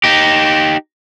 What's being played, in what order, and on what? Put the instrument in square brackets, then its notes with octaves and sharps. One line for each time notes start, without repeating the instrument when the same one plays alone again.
[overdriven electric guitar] D#4 G4